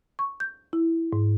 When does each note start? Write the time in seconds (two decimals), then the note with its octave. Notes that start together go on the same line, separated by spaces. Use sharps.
0.19 C#6
0.40 G6
0.73 E4
1.13 G#2